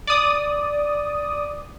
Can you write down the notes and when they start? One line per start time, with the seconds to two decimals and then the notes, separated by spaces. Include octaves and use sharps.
0.07 D5 D#6